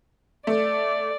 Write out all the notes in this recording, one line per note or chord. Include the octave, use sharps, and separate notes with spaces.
A3 D5